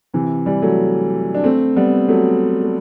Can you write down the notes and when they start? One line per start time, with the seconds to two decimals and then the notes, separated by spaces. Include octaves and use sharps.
0.14 C3 E3
0.46 E3 G3
0.62 F#3 A3
1.34 D4
1.44 A3 C4
1.76 G3 B3
2.08 F#3 A3
2.62 A3